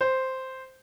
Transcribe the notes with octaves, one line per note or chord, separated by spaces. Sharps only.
C5